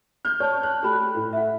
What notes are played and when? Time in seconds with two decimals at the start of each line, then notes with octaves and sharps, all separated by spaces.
0.25 F6 G6
0.40 C#5 D5 A5
0.63 F#6
0.83 A3 G4 G#4 B5 F#6
1.15 A2 A3
1.33 E5 F#5